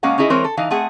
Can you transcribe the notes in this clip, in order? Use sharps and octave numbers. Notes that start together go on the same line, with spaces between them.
B2 G#3 A#3 C#4 F5 F#5
C#4 D#4 E4 G#4 D#5
E3 G#3 C4 A#4 C5 C#5
A4
E3 D#4 F5
A3 C4 G#4 F#5